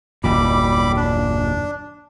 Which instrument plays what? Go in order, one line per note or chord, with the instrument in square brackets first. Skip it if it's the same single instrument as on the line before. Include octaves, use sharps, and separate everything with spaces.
[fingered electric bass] F#1 D#2 A#2 [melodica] G3 B5 D6
[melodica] D4